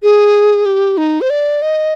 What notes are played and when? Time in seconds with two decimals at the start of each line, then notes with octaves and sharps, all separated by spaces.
0.03 G#4
0.65 G4
0.97 D#4
1.21 C5
1.30 D5
1.62 D#5